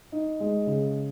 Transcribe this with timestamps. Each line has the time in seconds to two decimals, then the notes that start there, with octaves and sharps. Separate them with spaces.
0.12 D#4
0.40 G#3
0.67 C#3